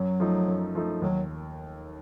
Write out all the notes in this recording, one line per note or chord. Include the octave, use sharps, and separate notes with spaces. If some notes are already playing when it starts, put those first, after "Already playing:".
Already playing: F#2 F#3
F3 A3 D#4
F#2
F3 A3 D#4
D#2 F#3